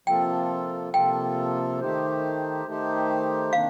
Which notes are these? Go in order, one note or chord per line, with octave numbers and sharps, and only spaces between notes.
C3 F3 A#3 F4 A4 G5
C3 F3 A#3 F4 A4 G5
D#3 A3 D#4 G4 C5
D#3 A3 D#4 G4 C5
C3 D#3 A#3 D4 F5